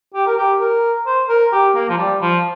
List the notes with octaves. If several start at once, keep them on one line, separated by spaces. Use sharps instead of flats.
G4
A#4
G4
A#4
C5
A#4
G4
A#3
F3
G3
F3